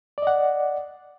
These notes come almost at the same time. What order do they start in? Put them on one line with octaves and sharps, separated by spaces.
D5 D#5 F#5